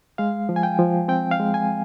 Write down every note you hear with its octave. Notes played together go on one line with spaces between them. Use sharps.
G#3 F5
F3
G#5
G5
F3
C4 G5
F5
G#3
G#5